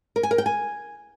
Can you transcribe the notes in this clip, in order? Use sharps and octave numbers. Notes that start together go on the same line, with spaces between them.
A#4
G#5
A#4
G5
G#5